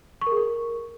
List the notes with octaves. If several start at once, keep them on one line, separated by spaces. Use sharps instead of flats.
C#6
A#4
G#4
A#4